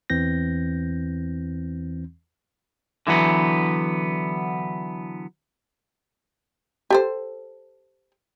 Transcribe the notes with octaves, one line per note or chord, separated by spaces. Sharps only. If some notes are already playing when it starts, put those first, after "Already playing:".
E2 E3 C4 G6 A#6
D3 E3 F#3 B3
G4 A4 C5